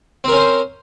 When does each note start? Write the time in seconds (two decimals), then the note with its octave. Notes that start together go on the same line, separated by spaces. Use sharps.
0.24 C4
0.28 A#4
0.32 C#4
0.36 C5